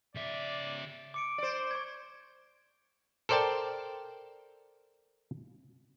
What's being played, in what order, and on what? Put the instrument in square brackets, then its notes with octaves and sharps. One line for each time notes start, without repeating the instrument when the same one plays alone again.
[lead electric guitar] C#3 E5 [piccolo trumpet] D5
[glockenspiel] D6 C#7 D7
[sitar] C5 D5
[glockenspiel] C#6 G#6
[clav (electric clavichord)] A4 A#4 C5 D5 G5 A5